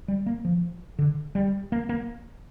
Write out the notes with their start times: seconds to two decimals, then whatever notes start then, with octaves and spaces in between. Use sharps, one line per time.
0.08 G3
0.26 A#3
0.45 F3
0.99 D3
1.35 G3
1.72 A#3
1.89 A#3